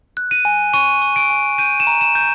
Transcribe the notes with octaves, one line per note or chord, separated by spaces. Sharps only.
F#6
D#7
G#5
C#6 D#7
C#6
D7
G#5
G6 D#7
E7
A#5
E7
G6